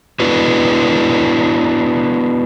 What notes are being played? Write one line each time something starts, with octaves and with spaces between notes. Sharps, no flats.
B3 D4 E4 F#4 B4